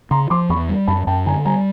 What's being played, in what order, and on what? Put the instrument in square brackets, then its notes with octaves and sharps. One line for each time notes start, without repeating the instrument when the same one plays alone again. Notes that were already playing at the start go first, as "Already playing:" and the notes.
[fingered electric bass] C#3 [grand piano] A#5 C6
[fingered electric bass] F3 [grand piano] C6 D6
[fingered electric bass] E2 [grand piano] B5 C#6
[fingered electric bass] G3
[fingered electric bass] F#2 [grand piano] A5 B5
[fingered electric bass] F#2 [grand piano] G5 A5
[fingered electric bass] D3 [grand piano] G#5 A#5
[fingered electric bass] G3 [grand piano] G#5 A#5